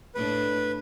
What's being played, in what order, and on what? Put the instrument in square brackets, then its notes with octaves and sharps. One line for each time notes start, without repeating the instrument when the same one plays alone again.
[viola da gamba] A2 D4 [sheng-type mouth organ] B4